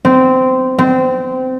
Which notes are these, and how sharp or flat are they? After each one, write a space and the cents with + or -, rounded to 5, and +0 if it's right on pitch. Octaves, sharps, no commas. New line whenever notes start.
C4 -15
C4 -25